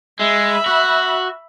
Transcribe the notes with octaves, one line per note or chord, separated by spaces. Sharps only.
G#3 E5 B5
F#4